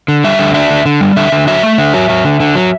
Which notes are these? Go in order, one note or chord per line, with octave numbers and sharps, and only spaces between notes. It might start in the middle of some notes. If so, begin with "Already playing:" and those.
D3
G3 E5
D3
D4 E5
D3
D3
G3
D3 E5
D3
F#3 E5
A3
D3
F#3
F#3
D3
D3
F#3